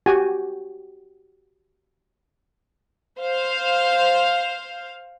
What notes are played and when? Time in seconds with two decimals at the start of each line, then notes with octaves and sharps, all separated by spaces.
0.06 F#4 G4 G#5
3.18 C5 F5